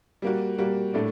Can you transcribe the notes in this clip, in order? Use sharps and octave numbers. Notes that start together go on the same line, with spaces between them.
G3 A#3 F#4
G3 A#3 F#4
A2 A3 D4